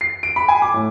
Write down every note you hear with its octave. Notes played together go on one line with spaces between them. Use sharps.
C7
D7
B5
G#5
D6
A2